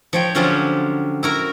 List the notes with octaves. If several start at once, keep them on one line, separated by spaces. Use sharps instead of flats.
F3 C#5 G5
D3 F3 F#3 C#4 F4 G4
E4 F#4 A#4